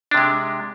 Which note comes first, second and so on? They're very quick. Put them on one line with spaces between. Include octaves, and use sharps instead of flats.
D4 C3 G#3